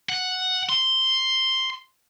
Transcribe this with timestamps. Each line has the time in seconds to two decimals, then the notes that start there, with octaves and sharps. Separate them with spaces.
0.09 F#5
0.69 C6